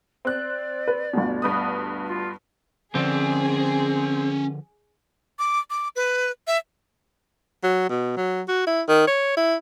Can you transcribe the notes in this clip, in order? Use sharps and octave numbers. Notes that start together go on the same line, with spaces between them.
C4 D5 F#6
B4
G1 D2 B2
G2 B4 D#6
F4
D3 F3 C4 C#4 G#4 D5
D6
D6
B4
E5
F#3
B2
F#3
F#4
E4
D#3
C#5
E4